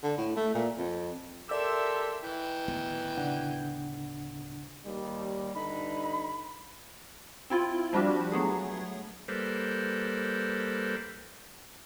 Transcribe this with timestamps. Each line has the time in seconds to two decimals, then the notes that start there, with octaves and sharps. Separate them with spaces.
0.03 D3
0.18 A2
0.36 A3
0.55 A#2
0.77 F2
1.49 G4 A4 A#4 D5 E5 C6 E6
2.24 E3 G5
2.68 D1 D#3 B3
3.17 C#3 D4 F#5
4.85 D#2 G3
5.55 G2 D3 D#4 B5
7.50 C4 E4 F4
7.93 F3 G3 D4 F#4 G4
8.32 F#3 A3 B3 G#4
9.28 G3 A#3 A4 B4 C5